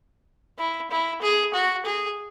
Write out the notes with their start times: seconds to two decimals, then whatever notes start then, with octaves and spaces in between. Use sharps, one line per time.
0.58 E4
0.91 E4
1.22 G#4
1.54 F#4
1.85 G#4